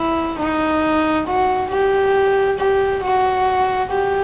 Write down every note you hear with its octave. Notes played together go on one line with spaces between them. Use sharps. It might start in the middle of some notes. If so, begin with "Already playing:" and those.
Already playing: E4
D#4
F#4
G4
G4
F#4
G4